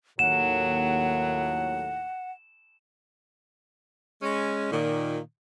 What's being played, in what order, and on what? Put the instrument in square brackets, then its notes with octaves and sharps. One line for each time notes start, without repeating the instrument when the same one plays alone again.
[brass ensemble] D#2 A2 A#3 [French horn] F#3 [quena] F#5 [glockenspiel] E7
[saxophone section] G#3 C#4
A#2 D#3